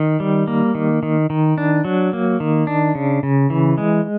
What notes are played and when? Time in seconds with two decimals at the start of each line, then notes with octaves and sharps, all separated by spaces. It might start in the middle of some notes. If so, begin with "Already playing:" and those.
Already playing: D#3
0.20 G3
0.47 A#3
0.75 D#3
1.03 D#3
1.30 D#3
1.58 D4
1.85 F#3
2.13 A#3
2.40 D#3
2.67 D4
2.95 C#3
3.23 C#3
3.50 E3
3.78 G#3